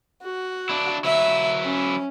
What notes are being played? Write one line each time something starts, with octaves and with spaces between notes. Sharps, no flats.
F#4
D4 E4
F#3 E4 E5
C#4